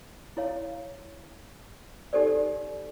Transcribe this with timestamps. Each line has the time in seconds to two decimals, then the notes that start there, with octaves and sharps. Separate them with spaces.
0.37 E4 C#5 F5
2.13 D#4 G4 A4 C5 D5